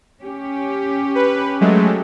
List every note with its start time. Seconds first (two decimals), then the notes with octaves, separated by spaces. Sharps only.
0.21 C#4 G4
1.15 B4
1.61 F#3 G#3 A3